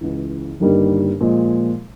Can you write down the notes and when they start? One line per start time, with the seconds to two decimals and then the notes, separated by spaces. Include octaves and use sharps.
0.01 C#2 C#3 E3
0.60 G1 G2 D#3 G3 A#3
1.21 A#2 F3 G#3